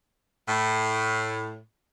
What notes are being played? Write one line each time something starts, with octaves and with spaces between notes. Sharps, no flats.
A2